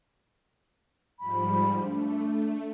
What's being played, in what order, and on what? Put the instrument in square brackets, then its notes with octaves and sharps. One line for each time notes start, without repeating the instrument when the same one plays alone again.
[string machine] G#2 F3 G3 [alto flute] B5
[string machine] A3 [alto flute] D4